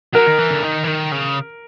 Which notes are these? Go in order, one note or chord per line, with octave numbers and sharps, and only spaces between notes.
F#3 A#4
D#3
E3
D3
D#3
E3
D#3
C#3